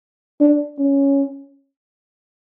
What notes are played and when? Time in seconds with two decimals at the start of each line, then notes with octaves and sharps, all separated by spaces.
0.41 D4
0.79 C#4